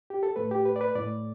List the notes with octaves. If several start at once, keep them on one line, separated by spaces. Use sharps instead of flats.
G4
A4
A2 A3 B4
G4
B4
D5
B4
A2 A3 D5